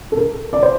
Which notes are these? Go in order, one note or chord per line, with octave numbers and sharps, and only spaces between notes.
A4
A#4
D5
C5